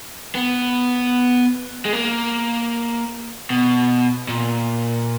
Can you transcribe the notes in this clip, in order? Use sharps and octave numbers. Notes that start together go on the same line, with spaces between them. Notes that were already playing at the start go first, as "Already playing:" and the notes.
B3
G#3
A#3
B2
A#2